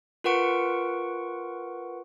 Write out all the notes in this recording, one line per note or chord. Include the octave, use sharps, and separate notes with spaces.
F4 A#4 B4 F#5 C#6 D7